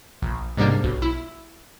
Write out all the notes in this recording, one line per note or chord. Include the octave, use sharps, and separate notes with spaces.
A#1
G#2 C3 G3 A#3 D4
B1
E4